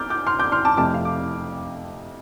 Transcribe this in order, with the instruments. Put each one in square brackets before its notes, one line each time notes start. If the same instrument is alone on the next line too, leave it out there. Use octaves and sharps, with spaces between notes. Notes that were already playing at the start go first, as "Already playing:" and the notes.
Already playing: [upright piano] D6 F6 G6 A6
D6 G6
C6 F6
D6 G6
C6 F6
A5 D6
F2 C3 A3 A5 D6
F5
D6